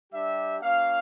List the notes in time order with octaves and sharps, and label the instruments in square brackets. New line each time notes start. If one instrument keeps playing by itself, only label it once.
[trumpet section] G3 D4 G4 E5
A#3 C#4 F4 F5